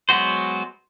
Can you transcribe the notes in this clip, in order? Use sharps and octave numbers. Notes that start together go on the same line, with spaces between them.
F#3 G#3 B3 F#4 C5